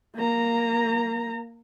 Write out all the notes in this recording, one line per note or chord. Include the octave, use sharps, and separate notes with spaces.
A#3 A#5